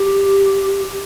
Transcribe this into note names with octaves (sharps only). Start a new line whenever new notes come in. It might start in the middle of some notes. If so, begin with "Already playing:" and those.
Already playing: G4